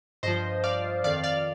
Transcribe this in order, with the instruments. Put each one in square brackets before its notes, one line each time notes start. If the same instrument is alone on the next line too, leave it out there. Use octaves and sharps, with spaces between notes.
[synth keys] G2 F3 C5 D#5
D5 F5
F2 D#3 D5 F5
D5 F5